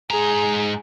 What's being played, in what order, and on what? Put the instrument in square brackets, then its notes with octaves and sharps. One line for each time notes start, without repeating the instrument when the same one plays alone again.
[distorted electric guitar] G#2 A#5 [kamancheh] G#4